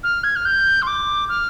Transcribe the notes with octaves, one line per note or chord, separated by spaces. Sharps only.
F6
G#6
F6
G6
C6
D6
F6